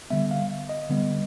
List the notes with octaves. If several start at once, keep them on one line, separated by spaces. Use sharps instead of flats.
D3 G3 B3 E5
F5
D#5
D3 G3 B3